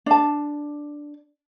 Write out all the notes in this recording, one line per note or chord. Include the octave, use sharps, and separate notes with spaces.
D4 A5